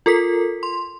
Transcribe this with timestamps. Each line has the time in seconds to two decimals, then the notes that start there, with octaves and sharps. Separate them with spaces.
0.06 F4 A4 A#4 B6
0.63 C6